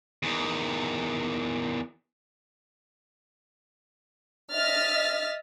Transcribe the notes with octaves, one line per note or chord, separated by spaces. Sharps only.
E2 D#3
D#5 E5 F6 A6 B6